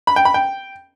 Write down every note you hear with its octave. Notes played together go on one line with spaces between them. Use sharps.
B5
G5
B5
G5